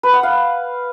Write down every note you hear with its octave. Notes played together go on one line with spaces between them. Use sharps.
B4
F#5
F5